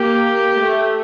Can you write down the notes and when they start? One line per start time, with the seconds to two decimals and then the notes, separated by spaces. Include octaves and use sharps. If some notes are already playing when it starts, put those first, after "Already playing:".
Already playing: A#3 G4
0.59 A3